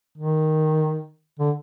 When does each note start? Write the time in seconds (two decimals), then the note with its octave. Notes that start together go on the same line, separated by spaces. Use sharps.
0.18 D#3
1.39 D3